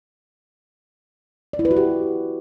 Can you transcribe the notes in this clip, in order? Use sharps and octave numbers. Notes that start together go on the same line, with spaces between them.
D5
E4
B4
F#4
G4